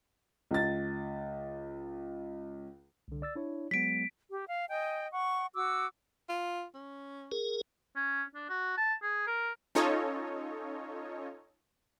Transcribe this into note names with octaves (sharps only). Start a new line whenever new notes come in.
C#2 A6
C2 D3
D5 E6 A6
D4 E4 C#5
F#3 G#3 B3 B6 D7
G4
F5
D#5 G5 G#5
F#5 C#6
F#4 D6 E6
F4
C#4
G#4 A#4
C#4
D4
F#4
A5
G#4
A#4
C#4 D#4 F4 A4 C#5 D#5